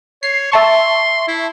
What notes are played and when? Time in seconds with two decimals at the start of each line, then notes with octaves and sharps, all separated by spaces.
0.23 C#5 C7
0.52 E5 A5 C6 C#6
1.28 E4